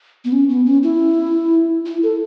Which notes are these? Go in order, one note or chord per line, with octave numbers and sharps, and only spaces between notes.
B3
C#4
B3
C#4
E4
E4
A4